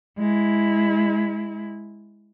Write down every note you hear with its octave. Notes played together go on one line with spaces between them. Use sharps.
G#3 E4